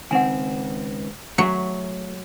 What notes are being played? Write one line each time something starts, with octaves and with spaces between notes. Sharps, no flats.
C#2 D#3 C4 F#5 G#5
F#3 A3 G#4 E5